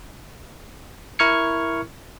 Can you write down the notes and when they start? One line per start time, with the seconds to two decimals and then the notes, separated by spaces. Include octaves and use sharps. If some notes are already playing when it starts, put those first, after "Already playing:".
1.19 E4 A#4 C#6 F6 G#6 C#7